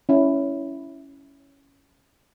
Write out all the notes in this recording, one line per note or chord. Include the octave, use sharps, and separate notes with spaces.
C#4 E4